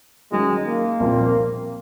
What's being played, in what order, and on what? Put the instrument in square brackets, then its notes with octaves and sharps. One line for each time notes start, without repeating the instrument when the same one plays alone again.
[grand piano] F#2 D#3 F#3 [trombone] G#3
[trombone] A#3
[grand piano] C2 A#2 F3 C4